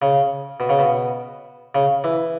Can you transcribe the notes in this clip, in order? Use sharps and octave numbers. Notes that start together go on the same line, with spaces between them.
C#3
B2
C#3
B2
C#3
E3